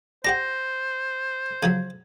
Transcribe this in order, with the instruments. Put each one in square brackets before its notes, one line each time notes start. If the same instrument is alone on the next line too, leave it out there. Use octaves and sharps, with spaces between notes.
[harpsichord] D4 G4 F#5 [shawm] C5 [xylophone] A#6
[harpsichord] C#3 F3 F#3 [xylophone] G#6